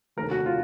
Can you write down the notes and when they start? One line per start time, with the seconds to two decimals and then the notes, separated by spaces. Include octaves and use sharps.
0.17 F1 D#2 D3 A#4
0.31 F#4
0.46 F4